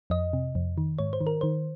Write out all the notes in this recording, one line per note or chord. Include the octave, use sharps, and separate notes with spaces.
F2 D#5
C3
F2
D#3
G#2 C#5
C5
D#3
A#4
D#3 C5